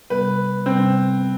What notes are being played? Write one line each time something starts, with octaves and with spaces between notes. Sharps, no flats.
C3 G3 B3 B4
C3 G3 B3 C4